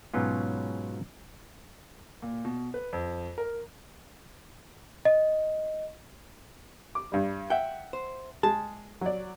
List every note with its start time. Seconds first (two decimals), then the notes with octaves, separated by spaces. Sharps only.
0.14 G#2 B2 F#3 B3 C#4 F4
2.22 A#2
2.45 B2
2.74 B4
2.93 F2
3.38 A#4
5.05 D#5
6.95 D6
7.12 G2 G3
7.50 E5 F#5 G5
7.93 C5
8.43 G#3 A5
9.01 F#3 D5